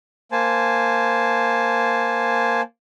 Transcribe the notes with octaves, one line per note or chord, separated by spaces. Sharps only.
A#3 C5 G#5 A5